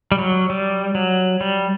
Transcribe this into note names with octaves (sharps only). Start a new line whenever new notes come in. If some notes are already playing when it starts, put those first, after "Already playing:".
G3
F#3
G3
F#3
G3